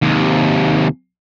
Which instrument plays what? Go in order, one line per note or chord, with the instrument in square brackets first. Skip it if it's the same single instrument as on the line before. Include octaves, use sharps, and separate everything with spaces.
[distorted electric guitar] D#2 C3